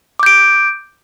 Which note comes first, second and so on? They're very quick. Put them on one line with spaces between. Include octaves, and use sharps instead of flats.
D6 G6 D7